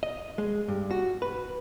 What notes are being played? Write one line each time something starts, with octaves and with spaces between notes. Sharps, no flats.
D#5
G#3
G2
F#4
B4